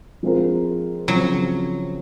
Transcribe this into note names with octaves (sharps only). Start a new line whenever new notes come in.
F3 G#3 C4 F4 A#4
C#3 F3 F#3 C4